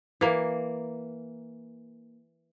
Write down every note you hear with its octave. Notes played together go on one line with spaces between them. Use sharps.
E3 A#3